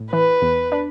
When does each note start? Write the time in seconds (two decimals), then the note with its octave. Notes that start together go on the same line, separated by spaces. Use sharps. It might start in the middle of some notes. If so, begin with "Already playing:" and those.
Already playing: A2
0.12 E3 B4
0.42 E2
0.72 D4